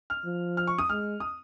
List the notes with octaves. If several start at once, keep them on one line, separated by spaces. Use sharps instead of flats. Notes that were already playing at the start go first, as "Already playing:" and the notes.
F6
F3
F6
C#6
D#6
G#3 F6
D#6